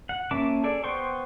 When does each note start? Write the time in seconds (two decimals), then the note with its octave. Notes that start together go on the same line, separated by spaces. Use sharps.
0.09 F#5
0.31 A#3 C#4 E5 A5 D6
0.64 G#4 A4 D5
0.84 B3 C5 G5 C6 C#6